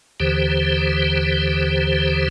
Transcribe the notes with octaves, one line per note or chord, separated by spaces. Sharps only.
D#2 D3 E3 G4 C5